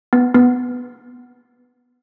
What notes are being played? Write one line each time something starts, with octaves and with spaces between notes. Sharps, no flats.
B3
B3